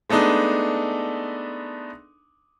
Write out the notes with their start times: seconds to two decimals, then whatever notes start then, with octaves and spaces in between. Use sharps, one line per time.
0.10 G#3 A3 B3 D4 D#4